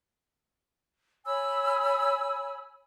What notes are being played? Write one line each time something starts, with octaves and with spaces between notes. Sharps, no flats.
C#5 G#5 B5 E6